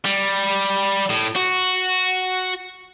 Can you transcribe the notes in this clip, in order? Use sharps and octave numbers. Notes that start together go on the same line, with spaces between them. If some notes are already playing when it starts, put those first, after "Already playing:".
G3
A2
F#4